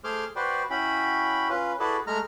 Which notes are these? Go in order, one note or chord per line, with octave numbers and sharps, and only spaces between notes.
A3 G#4 C5 C6 D6 F6
F#4 B4 C5 D5 G5
C#4 E4 F#4 G5 B5
C#4 F4 B4
E4 F#4 G#4 A4 B4 D5
G#3 A3 A#5 F6